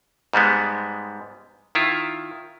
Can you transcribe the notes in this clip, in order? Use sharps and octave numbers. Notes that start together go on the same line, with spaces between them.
G#2 G3 G#3 B3
D#3 E4 F4